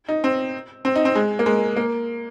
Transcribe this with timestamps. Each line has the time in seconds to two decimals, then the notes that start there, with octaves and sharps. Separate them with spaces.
0.08 D#4
0.24 C4
0.85 C4
0.96 D#4
1.05 C4
1.15 G#3
1.39 A#3
1.46 G#3
1.76 A#3